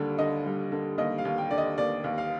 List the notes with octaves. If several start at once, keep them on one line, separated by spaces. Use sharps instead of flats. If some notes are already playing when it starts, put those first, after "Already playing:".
Already playing: D#2 D3 G3
D3 D#5
G3
D3
D#2 D#5
F5
D#2
G5
D3 D5
D#5
D#2 D5
D#2
F5